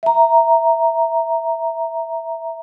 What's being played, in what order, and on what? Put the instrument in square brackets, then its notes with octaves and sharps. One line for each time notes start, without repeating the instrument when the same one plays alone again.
[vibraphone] E5 A#5